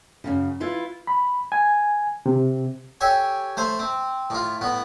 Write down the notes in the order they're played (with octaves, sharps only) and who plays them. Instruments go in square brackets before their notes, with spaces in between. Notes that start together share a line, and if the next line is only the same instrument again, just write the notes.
[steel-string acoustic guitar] F#2 A#2 C#3
E4 F4 B4
[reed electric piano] B5
G#5
C3
[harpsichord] G4 A4 C#5 G#5
A3 C5
C4
A2 F4
A2 B3